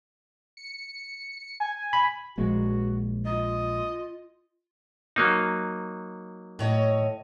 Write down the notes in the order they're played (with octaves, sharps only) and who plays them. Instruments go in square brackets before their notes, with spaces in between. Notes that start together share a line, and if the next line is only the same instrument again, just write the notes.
[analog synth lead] C#7
G#5
[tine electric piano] B5
[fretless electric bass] A#1 F3 G#3 [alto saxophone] F#4
[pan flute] F4 [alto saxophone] D#5
[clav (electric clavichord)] F#3 A#3 D#4
[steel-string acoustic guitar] A2 C#5 D#5